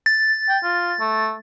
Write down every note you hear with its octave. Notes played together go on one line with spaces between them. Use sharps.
A6
G5
F4
A3